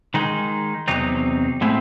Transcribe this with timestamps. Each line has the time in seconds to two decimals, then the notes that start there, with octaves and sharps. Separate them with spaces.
0.14 D#3 G#3 D#4
0.88 E2 C3 F#3 C4 D#4
1.61 A2 G#3 A3 C4 E4